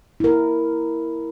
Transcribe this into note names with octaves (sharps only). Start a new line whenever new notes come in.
E4 A#4